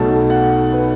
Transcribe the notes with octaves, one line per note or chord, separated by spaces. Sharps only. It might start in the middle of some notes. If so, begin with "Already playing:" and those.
Already playing: B1 B2 F#3 A3 A5
F#5
B4